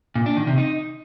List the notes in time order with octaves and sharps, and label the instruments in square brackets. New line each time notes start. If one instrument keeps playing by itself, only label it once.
[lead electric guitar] A#2
D4
D#3
C3
D#4